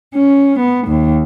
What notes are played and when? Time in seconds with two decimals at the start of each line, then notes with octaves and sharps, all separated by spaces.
0.13 C#4
0.59 B3
0.88 D#2